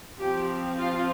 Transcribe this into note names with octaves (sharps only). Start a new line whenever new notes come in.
F3 C4 G4
F4